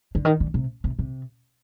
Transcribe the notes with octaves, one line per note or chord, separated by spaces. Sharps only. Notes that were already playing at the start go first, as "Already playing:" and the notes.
D3
D#3
D3
C3
C3
C3